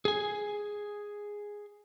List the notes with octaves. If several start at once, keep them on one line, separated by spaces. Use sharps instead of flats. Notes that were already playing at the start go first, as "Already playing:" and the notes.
G#4 G#5